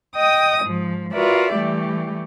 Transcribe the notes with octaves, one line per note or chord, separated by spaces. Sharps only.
D#5 G5 D#6
G#2 F3
F4 F#4 A#4 B4 D5 E5
E3 G3 A3 G4